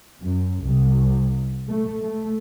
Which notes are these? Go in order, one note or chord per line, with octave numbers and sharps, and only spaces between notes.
F#2
C2
A3
A3